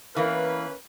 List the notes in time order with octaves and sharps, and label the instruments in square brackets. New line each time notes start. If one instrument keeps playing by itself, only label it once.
[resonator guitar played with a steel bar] E2 E3 A#3 [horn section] C#4 A#4 B4